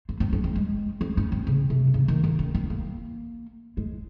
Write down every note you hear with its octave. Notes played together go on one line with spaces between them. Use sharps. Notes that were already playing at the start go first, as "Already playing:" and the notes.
C4
C4
C#4
C4
G#3
C4
C#4
C4
C#3
C3
C#3
D#3
D#3
C#4
C4
A#3
G#3